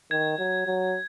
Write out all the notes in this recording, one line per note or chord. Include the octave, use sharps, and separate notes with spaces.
D#3 G#6
F#3
F#3